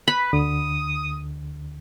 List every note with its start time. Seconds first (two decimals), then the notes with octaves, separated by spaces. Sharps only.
0.08 B4 B5
0.33 D2 D3 D#6